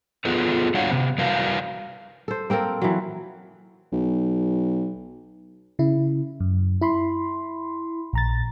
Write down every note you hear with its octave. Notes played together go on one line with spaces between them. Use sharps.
B3 F4 G#4 A4 B4
G3 D4 F#4 C#5 F5 F#5
C3 B3
G3 E4 F#4 A#4 B4 F5
A4 C5
A#3 C4 A4 A#4
E3 F#3
B1
C#3 E4
F#2
E4 B5 C6
A#1 A#5 A6